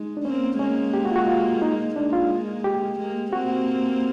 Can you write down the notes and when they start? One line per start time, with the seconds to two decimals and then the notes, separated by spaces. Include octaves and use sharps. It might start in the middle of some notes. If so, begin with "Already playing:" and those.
Already playing: G#3 D#4
0.17 D4
0.25 A#3 C4 C#4
0.59 G#3 A#3 C#4
0.94 G4
1.05 F#4
1.11 F4
1.16 F#4
1.28 F4
1.62 D#4
1.96 G#3 A#3 D4
2.13 F4
2.64 G4
2.99 G#3 A#3
3.33 A#3 C4 F#4